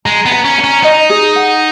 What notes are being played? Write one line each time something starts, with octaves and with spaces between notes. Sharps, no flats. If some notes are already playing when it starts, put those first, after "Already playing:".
G#3 A#5
B3
A#5
C#4
A#5
C#4
D#4 D#5
G#4
F#5